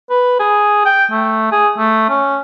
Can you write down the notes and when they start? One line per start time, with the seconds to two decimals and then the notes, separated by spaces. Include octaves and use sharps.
0.10 B4
0.40 G#4
0.85 G5
1.11 A3
1.52 G#4
1.78 A3
2.09 C#4